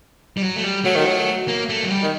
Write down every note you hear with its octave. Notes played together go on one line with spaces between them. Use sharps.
G3
F#3
A3
G3
F#3 A3
D#3
F#3
A#3
A3
F#3
G3
D#3